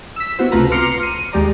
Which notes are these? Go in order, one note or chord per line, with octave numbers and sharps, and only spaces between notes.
E6 B6
B3 E4 F#4 C5
C#2 C3 A3 F4 B4 A#5
A#5 C6 D6 F6 C#7
D#7
D#2 G#3 G4 D5 A#5